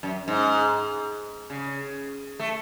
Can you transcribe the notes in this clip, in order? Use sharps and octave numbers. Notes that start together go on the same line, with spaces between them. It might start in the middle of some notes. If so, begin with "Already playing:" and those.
F#2
G#2
C#3
A3